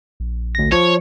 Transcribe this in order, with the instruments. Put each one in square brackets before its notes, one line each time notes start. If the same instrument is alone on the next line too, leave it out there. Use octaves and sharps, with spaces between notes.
[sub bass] A#1
[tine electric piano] D2 A#6
[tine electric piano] F3 [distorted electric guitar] C#5